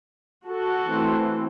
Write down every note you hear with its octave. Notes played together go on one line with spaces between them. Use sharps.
F#4 A4
E3 A3 C4